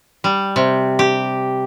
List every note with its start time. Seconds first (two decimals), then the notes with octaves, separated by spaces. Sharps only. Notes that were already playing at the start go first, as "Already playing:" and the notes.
0.24 G3
0.56 C3
0.99 G4